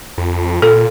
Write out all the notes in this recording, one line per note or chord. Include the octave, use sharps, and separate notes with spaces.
F2
A#2 A4